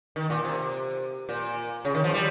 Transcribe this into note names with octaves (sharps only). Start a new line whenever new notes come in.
D#3
A#2
C3
A#2
C#3
D#3
F3
G3